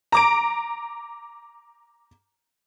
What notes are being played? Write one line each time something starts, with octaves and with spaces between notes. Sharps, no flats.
A#5 D6 D7